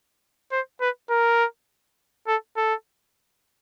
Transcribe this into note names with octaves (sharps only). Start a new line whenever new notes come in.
C5
B4
A#4
A4
A4